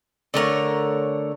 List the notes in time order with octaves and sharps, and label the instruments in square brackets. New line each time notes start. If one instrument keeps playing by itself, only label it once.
[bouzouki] D3 A3 A#4 C#5